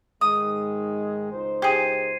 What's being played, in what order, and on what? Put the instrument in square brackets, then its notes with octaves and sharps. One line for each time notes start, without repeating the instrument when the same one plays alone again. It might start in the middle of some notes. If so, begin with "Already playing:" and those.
[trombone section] G#2 D#3 G#3 [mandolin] D#6
[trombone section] C#2 D#4 C5
[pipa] G4 G#4 [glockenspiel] G#6 C7 D#7